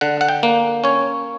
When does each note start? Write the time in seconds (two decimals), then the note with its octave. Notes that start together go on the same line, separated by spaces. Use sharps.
0.01 D3 F#5
0.21 F#5
0.28 G5
0.43 A#3
0.84 C#4 C#5